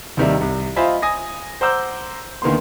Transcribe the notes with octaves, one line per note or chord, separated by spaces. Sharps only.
D#2 C3 D#3 G3 E5
C2
F4 C5 D#5 E5 G#5 B5
G#5 D#6 A#6
C5 F#5 A#5 D6 E6 G6
D2 D#3 A#3 B3 C6